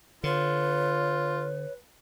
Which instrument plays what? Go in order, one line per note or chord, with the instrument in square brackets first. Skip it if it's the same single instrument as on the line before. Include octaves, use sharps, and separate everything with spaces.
[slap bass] D3 [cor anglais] F4 [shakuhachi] B4 [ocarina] C#5